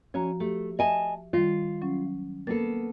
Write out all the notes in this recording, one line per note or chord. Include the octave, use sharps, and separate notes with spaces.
F3 C#4 F#4 A#5
A3 G4
D#5 E5 G#5 A5
D#3 G3 F4
F#3 C#4
A#3 B3 A4 A6